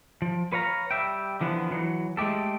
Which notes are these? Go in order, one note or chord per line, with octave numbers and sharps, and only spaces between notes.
F3
B4 C#5 F5 A#5
G3 E5 G5
D3 E3 F3 B3
E3 F#3
G#3 A3 G4 A4